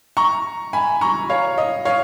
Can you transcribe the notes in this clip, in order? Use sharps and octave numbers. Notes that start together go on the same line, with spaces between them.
A#5 C#6
G#5 B5
A#5 C#6
C#5 F5
D#5
C#5 F5